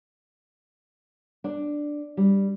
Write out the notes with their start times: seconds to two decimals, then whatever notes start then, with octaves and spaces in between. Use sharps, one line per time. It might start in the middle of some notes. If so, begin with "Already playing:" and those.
1.44 D4
2.17 G3